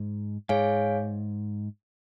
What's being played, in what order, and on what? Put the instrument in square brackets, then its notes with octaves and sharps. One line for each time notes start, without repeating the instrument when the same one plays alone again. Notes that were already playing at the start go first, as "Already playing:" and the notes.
Already playing: [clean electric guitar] G#2
[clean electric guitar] G#2 [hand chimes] G#4 C#5 F5 G#5